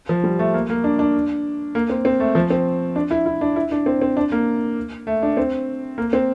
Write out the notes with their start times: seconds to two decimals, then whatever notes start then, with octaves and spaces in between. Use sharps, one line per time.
0.09 F3
0.24 G3
0.39 A3
0.54 A#3
0.70 A#3
0.84 D4
0.99 D4
1.75 A#3
1.90 C4
2.05 C4
2.20 A3
2.35 F3
2.50 C4
2.96 D4
3.11 E4
3.26 E4
3.41 D4
3.56 E4
3.72 D4
3.86 C4
4.02 C4
4.17 D4
4.32 A#3
5.07 A3
5.23 D4
5.37 C4
5.98 A#3
6.13 C4